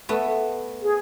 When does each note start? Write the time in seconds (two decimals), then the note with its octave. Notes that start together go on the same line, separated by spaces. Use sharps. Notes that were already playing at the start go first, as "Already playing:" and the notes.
0.09 A3 B3
0.82 G#4